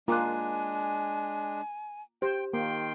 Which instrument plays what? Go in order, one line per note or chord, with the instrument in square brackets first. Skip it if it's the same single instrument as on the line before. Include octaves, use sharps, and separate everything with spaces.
[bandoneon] G#3 D4 [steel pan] A#3 F4 [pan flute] G#5 [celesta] A#5 D6 F#6
[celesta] G4 [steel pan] C5 [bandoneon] G5
[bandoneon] D#3 G5 C6 [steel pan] A#3